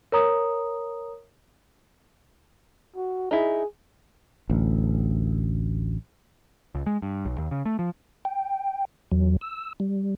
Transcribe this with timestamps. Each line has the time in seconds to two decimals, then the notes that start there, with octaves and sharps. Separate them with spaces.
0.12 A#4 C#5 A#5 D#6
2.96 F#4
3.31 D#4 E4 G#4
4.50 A1 D2
6.75 C#2
6.86 G#3
7.02 G2
7.25 B1
7.38 D#2
7.51 C#3
7.66 A3
7.79 F3
8.25 G5
9.12 E2 F#3
9.41 E6
9.80 G3